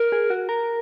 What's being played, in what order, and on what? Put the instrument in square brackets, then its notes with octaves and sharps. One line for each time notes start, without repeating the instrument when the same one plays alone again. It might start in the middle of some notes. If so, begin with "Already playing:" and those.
Already playing: [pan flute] A#4
[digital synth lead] G#4
F#4
A#4